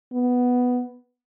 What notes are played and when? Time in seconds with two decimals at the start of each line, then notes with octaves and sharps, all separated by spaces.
0.13 B3